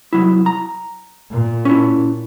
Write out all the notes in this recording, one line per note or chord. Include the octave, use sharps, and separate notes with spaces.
C2 F#3 E4
A#5
A#2
C#4 E4